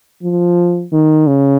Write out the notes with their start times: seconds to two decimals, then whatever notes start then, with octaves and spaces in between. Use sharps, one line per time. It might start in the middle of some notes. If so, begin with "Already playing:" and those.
0.23 F3
0.93 D#3
1.27 C#3